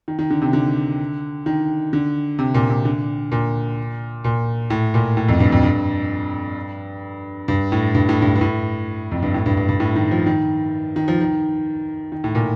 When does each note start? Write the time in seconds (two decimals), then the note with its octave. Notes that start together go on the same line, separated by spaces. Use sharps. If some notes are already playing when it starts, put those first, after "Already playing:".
0.08 D#3
0.19 D#3
0.30 D3
0.42 C3
0.53 D3
1.46 D#3
1.93 D3
2.39 C3
2.54 A#2
2.69 C3
2.85 D3
3.32 A#2
4.24 A#2
4.70 A2
4.94 A#2
5.17 A2
5.29 F2
5.40 G2
5.52 F2
5.63 G2
7.48 G2
7.72 A2
7.95 G2
8.09 A2
8.22 G2
8.35 G2
8.41 A2
9.11 F2
9.22 G2
9.34 A2
9.46 G2
9.57 G2
9.69 G2
9.80 A2
9.95 D#3
10.11 F3
10.26 D#3
10.96 D#3
11.08 F3
11.21 D#3
12.12 D#3
12.24 A2
12.35 A#2